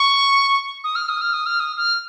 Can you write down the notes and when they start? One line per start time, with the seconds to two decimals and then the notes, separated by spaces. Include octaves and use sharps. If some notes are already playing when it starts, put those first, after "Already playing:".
Already playing: C#6
0.84 D#6
0.95 F6
1.09 D#6
1.21 F6
1.33 D#6
1.46 F6
1.60 D#6
1.77 F6